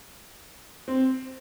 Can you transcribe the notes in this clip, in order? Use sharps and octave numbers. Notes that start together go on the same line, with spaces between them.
C4